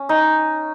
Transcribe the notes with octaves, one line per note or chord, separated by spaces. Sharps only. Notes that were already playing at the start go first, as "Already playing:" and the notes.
Already playing: C#4
D#4